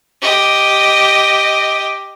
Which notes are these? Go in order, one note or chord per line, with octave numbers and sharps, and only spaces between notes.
G4 D#5